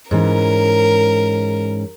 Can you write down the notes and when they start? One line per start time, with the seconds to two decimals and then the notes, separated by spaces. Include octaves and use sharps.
0.11 G#2 E3 C#4 A#4